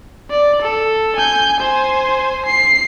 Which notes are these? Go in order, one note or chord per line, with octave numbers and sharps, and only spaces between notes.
D5
A4
G#5 G6
C5 G#5
C7